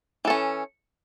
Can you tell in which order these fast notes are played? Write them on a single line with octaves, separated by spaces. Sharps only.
E3 A4 C#4